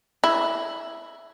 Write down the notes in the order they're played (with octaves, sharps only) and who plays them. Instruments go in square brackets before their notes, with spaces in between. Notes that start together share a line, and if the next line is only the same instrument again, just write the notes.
[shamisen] E4